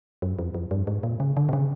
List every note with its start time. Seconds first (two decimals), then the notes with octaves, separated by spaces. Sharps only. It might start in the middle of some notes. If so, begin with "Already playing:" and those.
0.22 F#2
0.39 F2
0.55 F2
0.71 G2
0.87 G#2
1.03 A#2
1.20 C#3
1.37 D3
1.49 C3
1.53 C#3